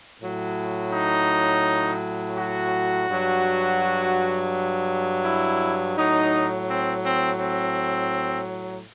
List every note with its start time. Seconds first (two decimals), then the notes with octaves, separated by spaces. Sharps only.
0.20 A2 F#3
0.93 D#4
2.37 F#4
3.09 G2 F#3
5.25 E4
5.97 A2 F#3 D#4
6.69 C4
7.05 C4
7.41 C4